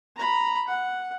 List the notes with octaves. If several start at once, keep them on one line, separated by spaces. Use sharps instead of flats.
A#5 B5
F#5